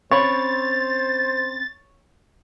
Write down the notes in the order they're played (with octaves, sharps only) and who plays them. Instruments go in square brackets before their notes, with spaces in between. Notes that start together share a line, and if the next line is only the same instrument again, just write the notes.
[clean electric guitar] C4 C#4 B5 [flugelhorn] C5 [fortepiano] C#5 [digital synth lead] A6